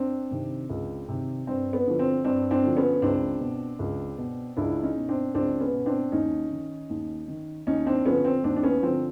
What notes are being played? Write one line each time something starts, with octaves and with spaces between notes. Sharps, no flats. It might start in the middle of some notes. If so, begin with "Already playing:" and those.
Already playing: C4 D4
C3 D#3
C#2
C3 D#3
G2 C4
B3
D3 F3
C4
G2 C4 D4
C4 D4
D3 F3
B3 C#4
C#2 C4 D4
B2
C#2
B2
C#2 D4 E4
C#4 D#4
B2
C4 D4
C#2 C4 D4
B3 C#4
B2
C4 D4
D#2 C#4 D#4
D#3
D#2
D#3
D#2 C#4 D#4
C4 D4
D3 F3 B3 C#4
C4
D#2 C4 D4
D4
B3 C#4
D3 F3 C4